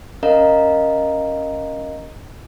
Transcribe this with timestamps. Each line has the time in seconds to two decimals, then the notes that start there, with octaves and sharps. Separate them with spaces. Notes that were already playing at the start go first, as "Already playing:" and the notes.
0.23 C#4 A#4 D#5 F5 A#5